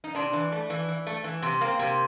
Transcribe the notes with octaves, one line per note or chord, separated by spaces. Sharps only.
D#4
C3 D4
E3
A3
E3
E3
A3
E3
C3
A#3 C4
C3